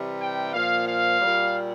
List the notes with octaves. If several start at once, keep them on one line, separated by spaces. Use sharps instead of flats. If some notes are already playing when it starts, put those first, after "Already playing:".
Already playing: C3 E3 G3
G5
A#2 F3 F5
F5
A#2 G3